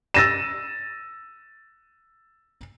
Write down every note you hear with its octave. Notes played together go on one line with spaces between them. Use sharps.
E6 A6 A#6 D#7 E7